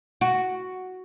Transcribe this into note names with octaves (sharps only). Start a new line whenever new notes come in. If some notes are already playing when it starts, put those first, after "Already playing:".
F#4